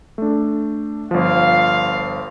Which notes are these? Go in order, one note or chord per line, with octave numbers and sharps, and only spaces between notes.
A3 D4
G1 F3 F5